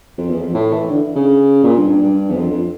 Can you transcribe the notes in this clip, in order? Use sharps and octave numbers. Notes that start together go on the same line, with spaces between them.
F2
E2
F2
A2
E3
D3
C#3
A#2
G2
G2
G2
E2
F2
F2